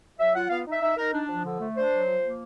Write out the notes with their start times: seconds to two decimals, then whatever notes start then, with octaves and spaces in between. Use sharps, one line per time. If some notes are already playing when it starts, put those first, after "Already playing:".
0.18 F#3 E5
0.34 F4 F#5
0.50 B3 F5
0.66 D#4
0.71 E5
0.81 D#4 E5
0.97 D#4 A#4
1.13 D4
1.28 F3
1.44 D3
1.60 A3
1.76 D4 C5
1.92 F#3
2.07 F3
2.23 A#3